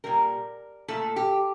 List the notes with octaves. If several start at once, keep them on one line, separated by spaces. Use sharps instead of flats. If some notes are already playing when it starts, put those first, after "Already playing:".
A#2 G3 A#4
A#2 A3 A4
G4